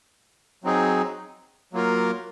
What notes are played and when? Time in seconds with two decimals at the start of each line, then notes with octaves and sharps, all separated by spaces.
0.64 F#3 C4 D#4 G#4
1.73 F#3 A#3 F4 A#4